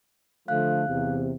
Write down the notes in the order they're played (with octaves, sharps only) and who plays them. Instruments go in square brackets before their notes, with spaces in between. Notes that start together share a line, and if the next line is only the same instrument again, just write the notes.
[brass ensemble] D3 F3 A3 [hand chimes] F5 F#6
[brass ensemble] E2 C3